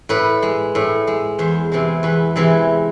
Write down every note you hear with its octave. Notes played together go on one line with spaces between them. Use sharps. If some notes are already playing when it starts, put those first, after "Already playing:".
A2 B4
G#3
A2
G#3
E2 C5
C3 E3 G#3
E2 B4
C3 E3 G#3